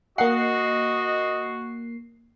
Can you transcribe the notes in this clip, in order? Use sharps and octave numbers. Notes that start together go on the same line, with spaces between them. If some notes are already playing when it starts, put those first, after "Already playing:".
A#3 F#4 D#5 F#5 C7